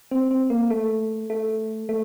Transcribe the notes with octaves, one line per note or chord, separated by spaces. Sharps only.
C4
C4
A#3
A3
A3
A3